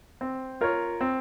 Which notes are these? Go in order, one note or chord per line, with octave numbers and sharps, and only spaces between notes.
C4
F4 A#4 C#5
C4